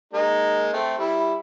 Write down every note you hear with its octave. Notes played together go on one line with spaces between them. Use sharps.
G#3 A#3 D#4
A3 C4
G3 E4